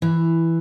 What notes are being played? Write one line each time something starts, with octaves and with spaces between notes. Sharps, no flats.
E3